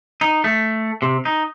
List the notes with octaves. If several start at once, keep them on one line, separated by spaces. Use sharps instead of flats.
D#4
A3
C3
D#4